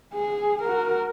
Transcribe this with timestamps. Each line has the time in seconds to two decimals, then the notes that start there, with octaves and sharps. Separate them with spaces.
0.14 G#4
0.62 F#4 A#4